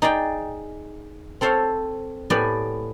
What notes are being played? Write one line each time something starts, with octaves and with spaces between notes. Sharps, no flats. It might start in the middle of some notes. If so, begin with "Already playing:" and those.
D#4 G#4 D5 G5
C4 A4 C5 C#5 F5
A2 B3 G4 D5 G#5 B5